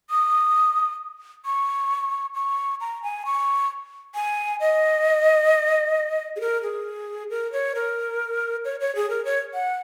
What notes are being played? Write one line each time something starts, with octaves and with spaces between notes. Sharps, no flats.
D#6
C#6
C#6
A#5
G#5
C#6
G#5
D#5
G#4
A#4
G#4
A#4
C#5
A#4
C#5
C#5
G#4
A#4
C#5
F#5